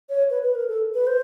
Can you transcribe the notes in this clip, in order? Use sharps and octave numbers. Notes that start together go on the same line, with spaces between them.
C#5
B4
B4
A#4
A4
B4
C5